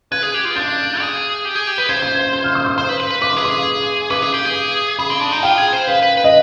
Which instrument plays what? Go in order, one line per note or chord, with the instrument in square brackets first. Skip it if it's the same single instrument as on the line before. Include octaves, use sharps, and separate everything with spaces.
[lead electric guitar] B4 [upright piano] G#6
[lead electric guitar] G#4
G4
F4
[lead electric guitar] D4 [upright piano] G6
[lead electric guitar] G#4
G4
G#4
G4
B4
[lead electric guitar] C5 [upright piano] G#6
[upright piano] G6
G#6
G6
F6
D#6
D#6
[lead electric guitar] C5 [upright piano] C6
[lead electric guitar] B4
B4
B4
[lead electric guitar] B4 [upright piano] D6
[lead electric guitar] G#4 [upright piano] C6
[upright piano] D6
[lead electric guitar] G#4
[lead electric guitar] B4 [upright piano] D6
[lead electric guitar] G#4
G4
G#4
[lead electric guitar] G#4 [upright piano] B5
[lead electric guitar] C4
D4
D#4
[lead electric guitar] F4 [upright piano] G5
[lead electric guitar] G#4
C5
[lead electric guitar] B4 [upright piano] F5
[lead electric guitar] B4
B4
[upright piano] D#5